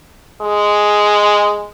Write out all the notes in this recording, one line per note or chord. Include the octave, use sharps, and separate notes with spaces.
G#3